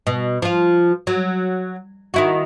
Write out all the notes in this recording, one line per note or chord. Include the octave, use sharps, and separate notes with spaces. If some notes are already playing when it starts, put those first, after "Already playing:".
B2
F3 F4
F#3
D#3 E4 F#4